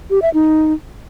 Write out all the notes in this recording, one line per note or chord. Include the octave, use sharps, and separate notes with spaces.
G4
E5
D#4